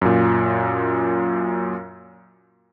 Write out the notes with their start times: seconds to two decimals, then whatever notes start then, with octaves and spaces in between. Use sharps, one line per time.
0.01 F#2 A#2